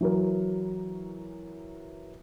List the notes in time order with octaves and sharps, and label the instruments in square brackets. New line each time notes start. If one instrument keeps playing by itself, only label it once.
[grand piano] E3 F#3 A#4